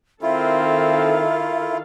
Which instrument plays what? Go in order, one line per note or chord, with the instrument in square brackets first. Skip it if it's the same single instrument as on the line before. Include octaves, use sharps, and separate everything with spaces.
[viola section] D#3 A4 F5 [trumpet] C4 [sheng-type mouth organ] E4 F4 [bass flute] E5